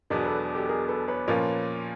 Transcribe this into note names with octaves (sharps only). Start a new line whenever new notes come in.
E2 B2 F#3 B3 D4 G#4 A#4
A4 B4
G4 A4
G#4 A#4
A4 B4
B4 C#5
A#2 F3 A#3 C#4 F4